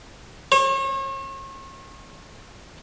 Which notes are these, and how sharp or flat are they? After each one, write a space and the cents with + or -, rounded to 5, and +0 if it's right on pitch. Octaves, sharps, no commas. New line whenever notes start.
C#5 -40